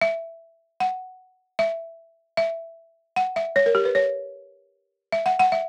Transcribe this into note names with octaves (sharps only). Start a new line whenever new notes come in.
E5
F#5
E5
E5
F#5
E5
C#5
A#4
G4
B4
C#5
E5
F#5
F#5
E5